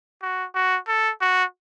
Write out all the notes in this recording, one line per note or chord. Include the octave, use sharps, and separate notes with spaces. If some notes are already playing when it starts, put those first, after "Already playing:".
F#4
F#4
A4
F#4